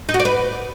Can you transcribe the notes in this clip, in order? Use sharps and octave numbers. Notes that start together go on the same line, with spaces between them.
D#4
F#4
D5
B4